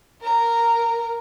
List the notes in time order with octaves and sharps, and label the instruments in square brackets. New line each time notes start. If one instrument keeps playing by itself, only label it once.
[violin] A#4 A#5